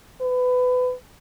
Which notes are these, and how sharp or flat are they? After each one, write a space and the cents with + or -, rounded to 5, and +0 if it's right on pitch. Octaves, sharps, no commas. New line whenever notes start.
B4 +25